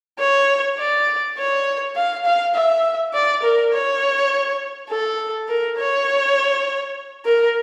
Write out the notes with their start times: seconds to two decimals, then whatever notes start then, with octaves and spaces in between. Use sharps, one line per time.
0.19 C#5
0.78 D5
1.37 C#5
1.96 F5
2.25 F5
2.55 E5
3.14 D5
3.43 A#4
3.73 C#5
4.90 A4
5.48 A#4
5.78 C#5
7.25 A#4